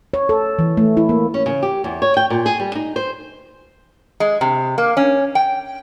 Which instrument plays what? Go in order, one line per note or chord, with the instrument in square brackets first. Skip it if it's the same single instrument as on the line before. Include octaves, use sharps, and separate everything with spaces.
[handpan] C#5
A4
E3
A3
E4
A#3
[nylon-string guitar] C#4
C#3
G4
E2
C#5
G5
A#2
G#4
G3
D#4
C5
[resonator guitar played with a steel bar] G#3
C3
A#3
C#4
G5